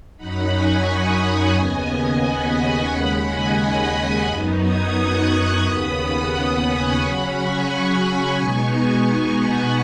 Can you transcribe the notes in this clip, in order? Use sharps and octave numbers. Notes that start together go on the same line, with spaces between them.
F#2 F#3 D#4 F#5 B5
G#5 C#6
B5 D#6
G#5 C#6
D#2 C#3 B3 D#5 G#5
F#5 B5
G#5 C#6
D#2 C#3 G#3 F#5 B5
D#5 G#5
B5 D#6
B5 D#6
F#2 F#3 B3 D#4
D#6 G#6
C#6 F#6
D#2 C#3 B3 B5 D#6
F#5 B5
F#5 B5
G#5 C#6
C#3 F#3 C#4 F#5 B5
G#5 C#6
B2 G#3 B3 D#4 G#5 C#6
F#5 B5